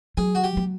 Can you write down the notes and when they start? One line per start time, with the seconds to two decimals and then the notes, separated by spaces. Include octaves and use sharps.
0.17 F#3 G#4
0.35 F#4
0.44 G4
0.57 F#3